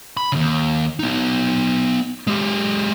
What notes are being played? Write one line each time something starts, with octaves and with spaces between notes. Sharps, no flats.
B5
D#2 C#3
B3 D#4
G#3 G4